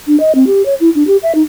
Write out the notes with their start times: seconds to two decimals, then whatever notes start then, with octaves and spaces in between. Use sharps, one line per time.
0.07 D4
0.20 D#5
0.35 C4
0.47 G4
0.65 C#5
0.80 E4
0.95 D4
1.07 G4
1.23 E5
1.35 D#4